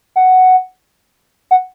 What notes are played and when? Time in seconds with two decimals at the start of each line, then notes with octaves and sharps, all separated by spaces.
0.16 F#5
1.51 F#5